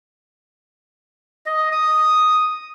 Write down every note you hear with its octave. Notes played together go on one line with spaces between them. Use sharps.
D#5
D#6